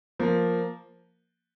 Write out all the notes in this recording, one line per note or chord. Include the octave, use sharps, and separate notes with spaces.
F3 A#3